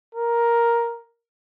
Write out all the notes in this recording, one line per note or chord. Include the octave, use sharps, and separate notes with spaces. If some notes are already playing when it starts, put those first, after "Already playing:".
A#4